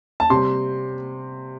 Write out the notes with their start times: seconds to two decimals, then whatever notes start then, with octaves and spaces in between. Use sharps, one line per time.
0.20 A5
0.30 C3 G3 C4 C6